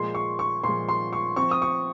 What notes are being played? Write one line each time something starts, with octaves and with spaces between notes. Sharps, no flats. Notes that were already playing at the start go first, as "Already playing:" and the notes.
Already playing: A#2 F3 G#3 C6
C#6
C#6
A#2 F3 G#3 C6
C6
C#6
F3 C4 C#6
D#6
C#6